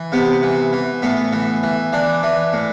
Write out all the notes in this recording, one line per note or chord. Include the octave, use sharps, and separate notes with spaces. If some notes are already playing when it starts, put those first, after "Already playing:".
Already playing: E3
C3 B3
E3
E3
A2 B3
E3
E3
E3 D4
E3
A2